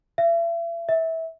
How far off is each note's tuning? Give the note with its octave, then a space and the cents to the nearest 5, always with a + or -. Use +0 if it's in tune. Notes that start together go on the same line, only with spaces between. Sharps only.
E5 +40
E5 -20